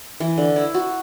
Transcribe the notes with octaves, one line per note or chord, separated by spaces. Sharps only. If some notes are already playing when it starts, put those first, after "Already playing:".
E3
D3
E4
F#4